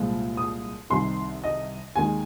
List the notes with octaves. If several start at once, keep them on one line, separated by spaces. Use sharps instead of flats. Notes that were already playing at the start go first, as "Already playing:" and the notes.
Already playing: C2 A#2 F3 G#3
D#6
C2 C3 D#3 C6
D#5
D#2 D#3 G#3 G#5